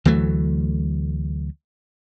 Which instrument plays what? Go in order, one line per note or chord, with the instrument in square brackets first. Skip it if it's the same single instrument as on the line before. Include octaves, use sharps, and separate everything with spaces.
[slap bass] D2 E3 F#3 A3